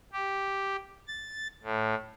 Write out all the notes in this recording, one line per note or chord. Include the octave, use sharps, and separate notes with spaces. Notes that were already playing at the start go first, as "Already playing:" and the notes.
G4
A6
A2